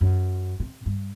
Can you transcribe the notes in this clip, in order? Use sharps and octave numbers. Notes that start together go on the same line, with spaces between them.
F#2
C3
G2